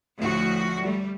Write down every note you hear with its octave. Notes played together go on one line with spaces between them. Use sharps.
D2 A2 F3 F#4
G3 A3